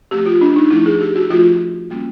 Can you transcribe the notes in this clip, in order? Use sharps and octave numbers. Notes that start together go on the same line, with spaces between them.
F3 A3 C4 G4
F4
D4
D#4
F3 A3 C4 E4
G#4
G4
F#4
F3 A3 C4 F4
G3 A#3 C#4